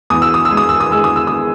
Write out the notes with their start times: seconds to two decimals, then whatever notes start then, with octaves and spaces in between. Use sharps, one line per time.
0.10 E2 D#6
0.22 E6
0.34 D#6
0.45 E6
0.51 G#3
0.57 D#6
0.69 E6
0.80 D#6
0.91 G#3 E6
1.04 D#6
1.16 E6
1.27 D#6